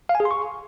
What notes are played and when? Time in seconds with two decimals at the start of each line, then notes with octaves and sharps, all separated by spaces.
0.09 F5
0.15 G#5
0.20 G#4
0.25 C6
0.31 C#6